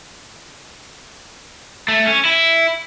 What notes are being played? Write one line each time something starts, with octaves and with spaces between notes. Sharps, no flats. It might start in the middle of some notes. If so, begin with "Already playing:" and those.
A3
C#4
E4